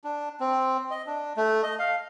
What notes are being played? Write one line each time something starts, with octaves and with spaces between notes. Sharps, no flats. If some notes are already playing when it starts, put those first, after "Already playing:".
D4
C4
D#5
D4
A3
D#5
F5